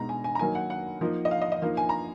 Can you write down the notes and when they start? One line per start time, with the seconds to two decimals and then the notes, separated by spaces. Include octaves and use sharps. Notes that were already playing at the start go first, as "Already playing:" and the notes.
Already playing: B2 G#3 D#4 A#5
0.09 G#5
0.24 G#5
0.35 A#5
0.39 D#3 F#3 A#3 D#4 G#5
0.55 F#5
0.70 F#5
1.01 F3 A#3 D#4
1.25 D#5
1.31 F5
1.41 D#5
1.52 D#5
1.62 F3 A#3 D#4 F5
1.77 G#5
1.89 A#5